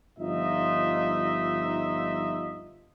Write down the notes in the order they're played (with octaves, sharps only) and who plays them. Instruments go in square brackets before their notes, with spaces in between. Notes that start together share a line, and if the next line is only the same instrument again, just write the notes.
[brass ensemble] G1 F3 D#4 F4 D#5 E5